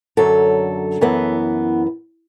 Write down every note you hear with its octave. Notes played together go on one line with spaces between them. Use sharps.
F#2 D3 F#3 A4
F#2 E3 B3